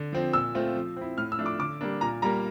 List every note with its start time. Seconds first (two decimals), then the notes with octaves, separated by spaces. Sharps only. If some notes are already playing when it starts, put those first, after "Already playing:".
Already playing: D3
0.13 F3 C4
0.33 A#2 E6
0.54 A3 C4 F4
0.75 F3
0.97 C4 E4
1.18 A2 F6
1.32 E6
1.39 F3 A3 D4
1.46 D6
1.59 D3 D6
1.81 G3 A#3 D4
2.01 A#2 A#5
2.22 G3 A#3 A#5